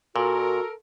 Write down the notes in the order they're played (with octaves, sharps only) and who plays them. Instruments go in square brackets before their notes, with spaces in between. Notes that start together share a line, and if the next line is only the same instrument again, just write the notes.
[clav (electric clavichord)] A#2 [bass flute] F#4 [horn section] A4 A#4